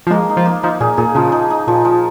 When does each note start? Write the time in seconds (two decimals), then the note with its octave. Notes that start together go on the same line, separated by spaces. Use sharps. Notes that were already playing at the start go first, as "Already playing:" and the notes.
0.07 F3
0.11 G#3 A#3
0.29 D#4
0.37 F3
0.46 A#3
0.63 F3 D#4
0.80 A#2 G#4
0.97 A#2 G#4
1.15 C#3 F3
1.32 D#4
1.50 D#4
1.67 A#2 F3
1.85 F3